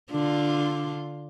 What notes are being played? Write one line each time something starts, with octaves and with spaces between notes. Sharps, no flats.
D3 D4 F4